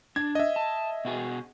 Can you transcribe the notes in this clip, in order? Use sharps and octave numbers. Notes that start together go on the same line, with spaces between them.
D4 G#6
D#5 E5
A5
B2 F#4 G#4